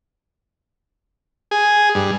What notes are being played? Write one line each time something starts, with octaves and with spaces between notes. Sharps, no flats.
G#4
G2